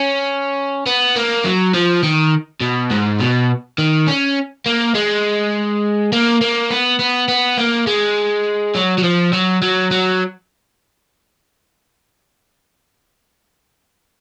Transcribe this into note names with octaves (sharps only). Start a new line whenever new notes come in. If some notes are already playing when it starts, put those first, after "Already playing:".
Already playing: C#4
B3
A#3
F#3
F3
D#3
B2
G#2
B2
D#3
C#4
A#3
G#3
A#3
A#3
B3
B3
B3
A#3
G#3
F#3
F#3
F3
F#3
F#3
F#3